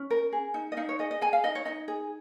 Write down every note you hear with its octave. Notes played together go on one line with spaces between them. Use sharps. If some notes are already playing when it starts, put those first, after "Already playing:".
Already playing: C#4
A#4
G#4
D#4
D#5
D#4 F5
C#5
G#4 D#5
D#5
G#4 G#5
F5
D#4 D#5
C#5
D#4 D#5
G#4